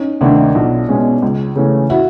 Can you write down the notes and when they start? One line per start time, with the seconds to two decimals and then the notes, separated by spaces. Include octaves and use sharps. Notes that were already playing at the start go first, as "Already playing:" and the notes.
Already playing: C#4 D#4
0.21 D2 C3 D#3 D4 E4
0.55 B1 D#4 F4
0.89 B2 G#3 C#4
1.22 C#2
1.55 C#3 E3 A3 C#4
1.90 E4 F#4